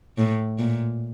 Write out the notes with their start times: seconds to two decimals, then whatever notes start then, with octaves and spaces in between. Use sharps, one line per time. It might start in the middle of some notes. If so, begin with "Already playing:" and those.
0.18 A2
0.59 A#2